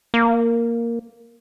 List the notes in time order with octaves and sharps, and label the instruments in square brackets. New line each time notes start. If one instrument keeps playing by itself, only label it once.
[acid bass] A#3